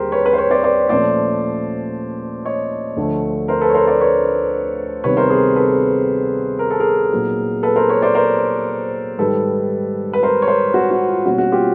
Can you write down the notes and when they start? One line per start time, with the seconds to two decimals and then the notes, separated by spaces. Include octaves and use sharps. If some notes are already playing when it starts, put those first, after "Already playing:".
Already playing: D#2 D3 G3 G4 G#4 A#4 C5
0.12 B4 C#5
0.25 B4 C#5
0.33 C5
0.38 B4 C#5
0.51 C5 D5
0.64 C5 D5
0.89 A#2 F3 A3 C#4 C5 D5
2.45 C#5 D#5
2.96 D2 D3 F3 A3 D4
3.48 A#4 C5
3.61 A4 B4
3.70 C#5
3.75 A#4 C5
3.87 C5 D5
4.00 B4 C#5
5.04 C3 D#3 G3 B3 B4 C#5
5.17 A#4 C5
5.30 G#4 A#4
5.56 A4 B4
6.59 A#4
6.71 A4
6.80 G#4 A#4
7.12 A#2 F#3 B3 D#4
7.63 A4 B4
7.76 A#4 C5
7.89 B4 C#5
8.02 C5 D5
8.15 A#4 C5
9.18 G#2 D#3 G3 A4 B4
10.13 B4
10.23 A#4 C5
10.42 C#5
10.48 A#4 C5
10.74 F#4
10.91 F#4
11.08 F4
11.26 B2 G3 A#3 C#4 F#4
11.38 F#4
11.52 F4 G4